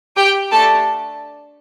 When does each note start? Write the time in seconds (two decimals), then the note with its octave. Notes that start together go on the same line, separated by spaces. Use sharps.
0.16 G4 G5
0.51 A3 D4 G4 A4 A5